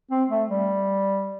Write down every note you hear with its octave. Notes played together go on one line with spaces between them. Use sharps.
C4
A3
G3